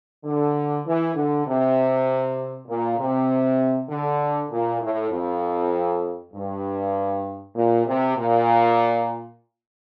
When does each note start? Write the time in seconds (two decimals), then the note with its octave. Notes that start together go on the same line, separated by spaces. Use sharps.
0.24 D3
0.86 E3
1.15 D3
1.46 C3
2.67 A#2
2.98 C3
3.89 D3
4.50 A#2
4.81 A2
5.11 F2
6.33 G2
7.54 A#2
7.85 C3
8.16 A#2